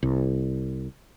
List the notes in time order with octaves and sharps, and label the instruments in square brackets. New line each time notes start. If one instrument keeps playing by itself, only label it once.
[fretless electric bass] C2